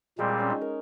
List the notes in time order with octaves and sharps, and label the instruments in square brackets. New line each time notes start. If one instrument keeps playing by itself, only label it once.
[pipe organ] A#2 G3 C4 [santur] G#3
[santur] G#3
C#4
D#4
A#4